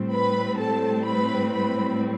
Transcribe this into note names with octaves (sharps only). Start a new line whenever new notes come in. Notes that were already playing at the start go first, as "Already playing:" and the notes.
Already playing: A2 G3 C4
B4 B5
A4 A5
B4 B5
B4 B5